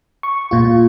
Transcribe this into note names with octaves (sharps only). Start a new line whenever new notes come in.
C#6
A#2 F4